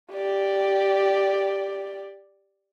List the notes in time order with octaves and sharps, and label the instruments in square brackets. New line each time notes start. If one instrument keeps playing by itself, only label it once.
[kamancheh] G4 D5